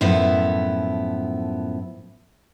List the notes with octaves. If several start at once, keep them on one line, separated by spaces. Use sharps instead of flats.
F#2 A2 F3 A3 B3 E4